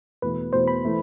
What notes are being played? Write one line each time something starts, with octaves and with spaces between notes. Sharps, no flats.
E2 B2 A3 B4
E2 B2 A3 C5
B5
E3 A3 E4